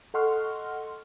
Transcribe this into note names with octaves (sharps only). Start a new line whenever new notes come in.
A4 D#5 F#5 C6 C#6 F6